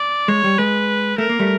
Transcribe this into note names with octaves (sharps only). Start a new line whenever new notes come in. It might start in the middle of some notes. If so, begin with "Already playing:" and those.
Already playing: D5
G#3 C#5
G3
G#3 B4
A3 A#4
A#3
G3 A3